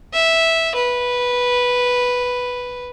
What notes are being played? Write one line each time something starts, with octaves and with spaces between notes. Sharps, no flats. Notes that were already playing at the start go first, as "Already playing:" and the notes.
E5
B4